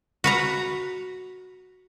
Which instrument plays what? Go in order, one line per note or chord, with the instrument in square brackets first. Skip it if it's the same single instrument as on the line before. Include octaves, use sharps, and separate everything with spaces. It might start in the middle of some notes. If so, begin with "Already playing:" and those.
[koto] F#4 B4 A#5